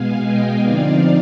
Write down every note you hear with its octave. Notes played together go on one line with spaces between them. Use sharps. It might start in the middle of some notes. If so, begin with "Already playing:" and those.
Already playing: B2 G#3 B3 F5 G#5
D#5 G5
D3 F3 C4 D#4 D5 F5